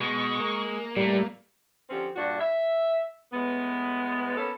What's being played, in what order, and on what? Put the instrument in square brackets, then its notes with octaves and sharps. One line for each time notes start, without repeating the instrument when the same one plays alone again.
[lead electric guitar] B2 [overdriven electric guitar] G#3 [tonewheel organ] C#6
[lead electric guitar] A#3
[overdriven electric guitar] A2 A3 [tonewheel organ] G3
[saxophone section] D3 F3 C4 C#4 G4
G2 A#2 D4 F#4
E5
A2 G#3 B3
A#3 B3 C#4 A4